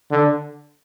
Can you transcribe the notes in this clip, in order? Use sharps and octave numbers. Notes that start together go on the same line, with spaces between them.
D3